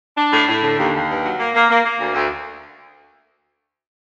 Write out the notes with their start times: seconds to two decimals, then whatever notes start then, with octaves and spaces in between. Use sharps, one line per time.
0.17 D4
0.33 A2
0.48 A2
0.62 D3
0.78 D#2
0.94 D#2
1.09 G2
1.24 F#3
1.38 A#3
1.54 A#3
1.70 A#3
1.84 A#3
1.99 D2
2.14 D2